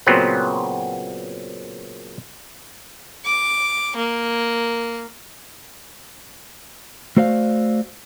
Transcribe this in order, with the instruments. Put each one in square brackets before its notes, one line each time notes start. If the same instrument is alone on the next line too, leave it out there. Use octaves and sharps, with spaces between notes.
[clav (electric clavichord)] A#2 C#3 F#3 B3 C4 F#5
[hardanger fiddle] D6
A#3
[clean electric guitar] A3 F#4 C5 D5 F5